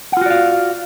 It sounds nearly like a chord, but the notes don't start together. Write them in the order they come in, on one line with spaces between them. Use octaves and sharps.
F#5 F4 F#4 D5 F5